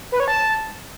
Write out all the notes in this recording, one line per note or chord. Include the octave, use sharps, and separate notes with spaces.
B4
C#5
A5